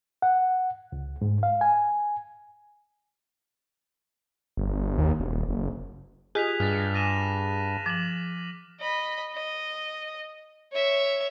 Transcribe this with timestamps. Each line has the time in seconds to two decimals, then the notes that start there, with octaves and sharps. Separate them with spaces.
0.22 F#5
0.92 C#2
1.21 G#2
1.43 F5
1.61 G#5
4.57 G1
4.98 D#2
5.20 E1
5.35 D#1
5.49 F#1
6.35 F4 G4 G#4 D#5 F#6 B6 F7
6.60 G2 F6 A6
6.94 G#5 A6 A#6 D#7 E7
7.86 F3 D6 E7 F#7
8.80 D#5 B5
9.33 D#5
10.72 C#5 E5